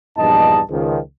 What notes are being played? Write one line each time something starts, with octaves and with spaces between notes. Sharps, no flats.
A#1 E2 G2 D#4 D#5 A5
C#2 D#3 F3